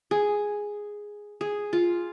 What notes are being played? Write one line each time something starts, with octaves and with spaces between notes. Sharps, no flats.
G#4
G#4
F4